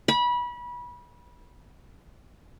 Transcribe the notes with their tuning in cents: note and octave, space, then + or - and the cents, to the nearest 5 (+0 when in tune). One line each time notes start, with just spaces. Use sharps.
B5 -25